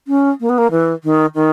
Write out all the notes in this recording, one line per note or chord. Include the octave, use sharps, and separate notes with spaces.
C#4
A#3
B3
A#3
E3
D#3
D#3